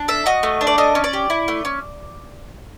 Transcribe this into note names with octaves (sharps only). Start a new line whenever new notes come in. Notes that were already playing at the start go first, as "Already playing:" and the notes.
Already playing: D4
A4 E5
F#4 D#5
A3
D4
D5
A3 D#5
C#4
D5
G4
E4
A3
C#4